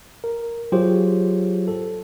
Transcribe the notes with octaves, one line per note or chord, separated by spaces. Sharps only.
A#4
F#3 F4 G4 G#4 C5 C#5
A4